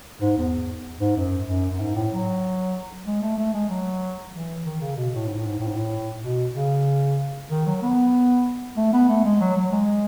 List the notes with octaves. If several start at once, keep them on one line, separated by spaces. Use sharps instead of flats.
G#2
E2
G#2
F#2
F#2
F#2
G#2
A2
F#3
G#3
A3
A3
G#3
F#3
E3
D#3
C#3
B2
A2
G#2
A2
G#2
A2
G#2
A2
B2
C#3
D#3
F#3
B3
A3
B3
A3
G#3
F#3
F#3
G#3